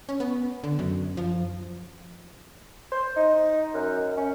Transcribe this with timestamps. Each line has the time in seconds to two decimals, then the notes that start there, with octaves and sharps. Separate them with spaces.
0.09 C#4
0.20 B3
0.64 D3
0.79 F#2
1.17 F3
2.92 C5
3.16 D#4
3.74 F#2
4.17 C#4